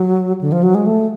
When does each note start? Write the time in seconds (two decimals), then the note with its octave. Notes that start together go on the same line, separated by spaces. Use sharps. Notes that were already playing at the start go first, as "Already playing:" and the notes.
Already playing: F#3
0.41 D3
0.52 F3
0.63 F#3
0.75 G#3
0.86 A3